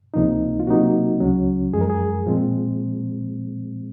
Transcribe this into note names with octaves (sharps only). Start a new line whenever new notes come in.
C#2 C3 F3 A#3 D#4
F4
C3 F#3 A#3 D#4 F#4
C#2 C#3 F#3 C#4
F#2 F3 G#3 G#4
A#4
G#4
A#2 F3 G#3 C4